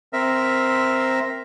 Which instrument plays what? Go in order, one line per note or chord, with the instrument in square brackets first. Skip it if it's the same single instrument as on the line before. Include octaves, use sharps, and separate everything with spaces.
[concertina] C4 A#4 E5